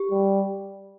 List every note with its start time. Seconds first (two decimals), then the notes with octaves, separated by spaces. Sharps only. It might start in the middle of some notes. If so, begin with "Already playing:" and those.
Already playing: G4
0.11 G3